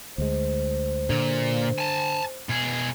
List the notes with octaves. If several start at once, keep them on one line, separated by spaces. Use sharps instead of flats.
D2 G#3 C5
A#2 D3
G#5 A5
B2 G#4